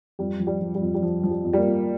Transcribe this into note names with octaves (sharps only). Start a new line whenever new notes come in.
F2 G3
F3
G3
F3
G3
F2
G3
F3
F3
G3
F2
G3
A#3
F2